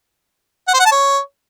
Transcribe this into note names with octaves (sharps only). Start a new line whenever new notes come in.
F#5
C5
F#5
A5
C#5